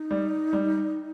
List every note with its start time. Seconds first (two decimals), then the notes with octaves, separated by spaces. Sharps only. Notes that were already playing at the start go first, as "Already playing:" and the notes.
Already playing: D#4
0.11 G3
0.53 G3